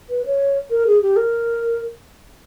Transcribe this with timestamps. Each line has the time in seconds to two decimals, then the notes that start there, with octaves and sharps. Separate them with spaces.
0.10 B4
0.25 C#5
0.70 A#4
0.87 G#4
1.02 G4
1.16 A#4